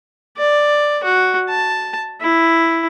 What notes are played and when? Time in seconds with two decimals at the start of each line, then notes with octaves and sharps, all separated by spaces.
0.37 D5
1.04 F#4
1.49 A5
2.21 E4